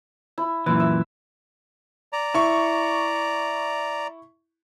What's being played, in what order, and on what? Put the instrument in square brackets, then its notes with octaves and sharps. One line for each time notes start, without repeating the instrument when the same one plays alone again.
[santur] E4
[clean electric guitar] F#2 A#2 E3 [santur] E4
[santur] E5
[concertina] D5 A#5
[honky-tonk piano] E4 C#6